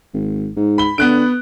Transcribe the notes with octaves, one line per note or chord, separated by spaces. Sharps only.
G#1
G#2
B5 G7
D3 B3 F#6 D7